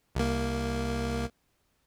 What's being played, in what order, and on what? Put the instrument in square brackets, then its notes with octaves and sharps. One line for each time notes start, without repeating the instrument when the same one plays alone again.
[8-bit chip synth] C2 A#3